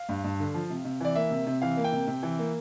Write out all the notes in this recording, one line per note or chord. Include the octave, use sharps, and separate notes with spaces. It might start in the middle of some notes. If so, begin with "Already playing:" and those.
Already playing: F5
G2
G2
D3
F3
C3
C3
E3 D5
A#3 E5
C3
C3
E3 F5
A#3
G5
C3
C3
E3
A#3